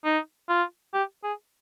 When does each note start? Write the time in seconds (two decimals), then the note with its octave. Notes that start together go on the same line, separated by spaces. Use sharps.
0.05 D#4
0.49 F4
0.94 G4
1.24 G#4